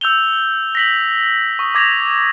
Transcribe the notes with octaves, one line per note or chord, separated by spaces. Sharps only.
E6 G6 F7 G7
A#6 B6 F#7
C#6 D#6
D6 G#6 A#6 B6 F7